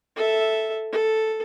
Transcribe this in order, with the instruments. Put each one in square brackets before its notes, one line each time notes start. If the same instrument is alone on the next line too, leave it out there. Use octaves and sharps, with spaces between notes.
[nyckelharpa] A4 E5
A4